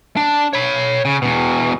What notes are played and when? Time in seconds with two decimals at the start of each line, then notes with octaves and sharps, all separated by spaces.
0.17 D4
0.53 C#5 B5
1.05 C#3
1.22 E2 B2